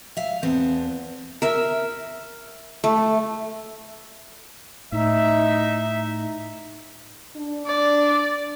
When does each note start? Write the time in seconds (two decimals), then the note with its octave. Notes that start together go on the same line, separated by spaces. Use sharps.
0.17 E5 F5
0.43 E2 B3 C4 B4 A5
1.42 A#4 E5
2.84 A3
4.92 A2 D#4 E5
7.36 D4
7.66 D5